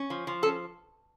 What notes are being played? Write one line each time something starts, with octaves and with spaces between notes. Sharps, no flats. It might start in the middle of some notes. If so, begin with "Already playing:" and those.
Already playing: C#4
F3
F3
C#4 A4